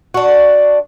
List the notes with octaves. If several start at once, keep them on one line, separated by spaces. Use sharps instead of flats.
D4 F#4